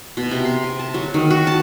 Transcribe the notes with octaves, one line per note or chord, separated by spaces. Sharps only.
B2
C3
C6
C3
A5
F#3
D#3
F#4
A5